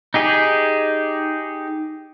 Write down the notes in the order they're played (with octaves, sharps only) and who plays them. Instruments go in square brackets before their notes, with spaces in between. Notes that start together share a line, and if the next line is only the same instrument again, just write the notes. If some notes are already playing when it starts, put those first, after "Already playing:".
[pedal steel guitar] D#4 G4 G#4